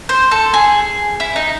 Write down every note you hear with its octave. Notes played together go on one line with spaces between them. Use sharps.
C5
A4
G#4
E4
D#4